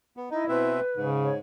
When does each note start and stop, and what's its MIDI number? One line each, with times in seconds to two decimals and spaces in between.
0.17 0.29 59
0.31 0.44 63
0.31 0.73 64
0.31 0.46 75
0.49 0.80 47
0.49 0.80 60
0.49 1.08 71
0.49 0.80 76
0.97 1.39 44
0.97 1.31 49
1.23 1.35 73